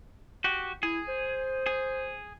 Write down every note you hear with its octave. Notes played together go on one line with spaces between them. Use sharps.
F#4 G4
E4 G#4
C5
G#4